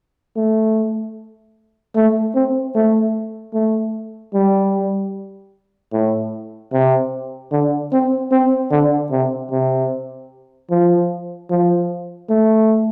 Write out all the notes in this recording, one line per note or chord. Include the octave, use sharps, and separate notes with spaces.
A3
A3
C4
A3
A3
G3
A2
C3
D3
C4
C4
D3
C3
C3
F3
F3
A3